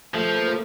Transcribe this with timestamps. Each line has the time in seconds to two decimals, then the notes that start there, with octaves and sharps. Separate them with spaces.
0.14 F3 A3
0.35 A#3
0.47 A#3